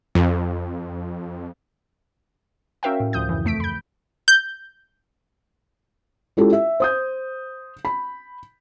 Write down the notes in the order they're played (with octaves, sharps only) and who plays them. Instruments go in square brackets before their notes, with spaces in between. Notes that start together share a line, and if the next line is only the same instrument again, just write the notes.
[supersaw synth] F2
[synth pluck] C#4 F#4 A#4 E5 F5 G5
A2
D2 F3 D#6 G6
F#2 C#3 E3
F2 A3 B6 D7
B5 G6
[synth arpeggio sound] G6
[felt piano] G#3 C#4 E4 F4 G4 A4
E5
C5 D#6 G6
B5